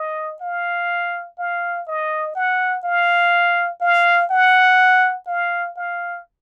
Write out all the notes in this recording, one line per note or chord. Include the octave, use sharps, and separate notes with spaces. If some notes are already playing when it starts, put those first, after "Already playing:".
Already playing: D#5
F5
F5
D#5
F#5
F5
F5
F#5
F5
F5